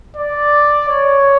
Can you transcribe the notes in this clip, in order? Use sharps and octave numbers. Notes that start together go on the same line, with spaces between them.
D5
C#5